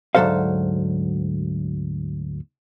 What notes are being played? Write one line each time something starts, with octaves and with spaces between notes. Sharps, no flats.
D2 G#2 F#3 A4 C5 F5